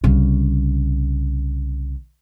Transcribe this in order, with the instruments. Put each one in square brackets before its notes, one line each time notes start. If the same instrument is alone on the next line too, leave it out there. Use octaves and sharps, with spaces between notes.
[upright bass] C2 C#3